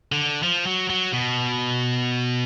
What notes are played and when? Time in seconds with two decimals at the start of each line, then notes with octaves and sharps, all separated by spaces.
0.12 D3
0.43 F3
0.67 F#3
0.90 F#3
1.13 B2